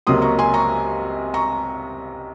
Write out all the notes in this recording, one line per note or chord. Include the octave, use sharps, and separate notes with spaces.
C#2 C3 F#3 A#3 C6 D#6
A#5 C#6
G#5 C6
A#5 C#6
A#5 C#6